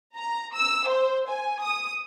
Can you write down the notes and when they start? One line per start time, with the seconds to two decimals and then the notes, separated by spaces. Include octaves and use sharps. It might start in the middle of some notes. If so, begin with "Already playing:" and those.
0.16 A#5
0.54 E6
0.87 C5
1.29 G#5
1.62 D#6